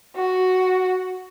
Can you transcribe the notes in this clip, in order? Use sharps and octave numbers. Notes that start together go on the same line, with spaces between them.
F#4